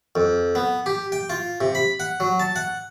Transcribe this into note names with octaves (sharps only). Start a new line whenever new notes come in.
F2
B3
G4
G5
F4
C3
B5
F#5
F#3
A5
F#5